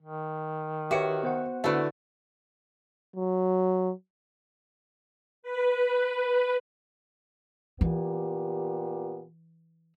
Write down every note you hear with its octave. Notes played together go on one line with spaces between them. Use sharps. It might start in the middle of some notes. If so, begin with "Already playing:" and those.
D#3
F#4 G4 B4 C#5 E5 C#7
B3 C5 F#5
D3 A3 E4 F#4 B4
F#3
B4
A#2 E3 B3 G4